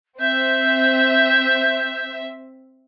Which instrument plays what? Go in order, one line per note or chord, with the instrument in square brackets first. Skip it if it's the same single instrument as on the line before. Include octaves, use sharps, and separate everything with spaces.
[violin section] C4 E5 [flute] G6